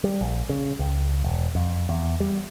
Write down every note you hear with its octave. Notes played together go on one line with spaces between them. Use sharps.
G3
A#1
C#3
C#2
E1
F2
E2
G3